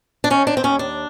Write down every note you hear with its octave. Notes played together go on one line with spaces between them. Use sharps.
D4
D#3 C#4
D4
C4
D#2 C#4
D4